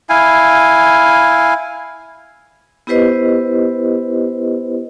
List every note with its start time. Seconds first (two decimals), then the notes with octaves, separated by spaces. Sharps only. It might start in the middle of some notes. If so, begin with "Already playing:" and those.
0.09 E4 F5 G#5
2.87 B3 E4 G4 B4 C5 D#5